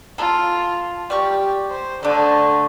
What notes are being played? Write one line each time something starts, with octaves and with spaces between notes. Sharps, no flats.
F4 A4
G3 G4 D5 C#6
C5
D3 A3 D4